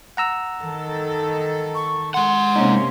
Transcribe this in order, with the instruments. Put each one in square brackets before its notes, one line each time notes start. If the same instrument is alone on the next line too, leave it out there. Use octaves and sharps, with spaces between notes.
[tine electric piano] F#5 A#5 E6
[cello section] D#3 A4
[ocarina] C#6
[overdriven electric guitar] G#3 F#5 [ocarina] C6
[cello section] C3 A#3 C#4 [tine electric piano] D#4